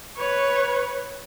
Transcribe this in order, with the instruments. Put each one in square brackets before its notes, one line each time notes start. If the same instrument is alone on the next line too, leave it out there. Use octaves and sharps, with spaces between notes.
[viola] B4 C#5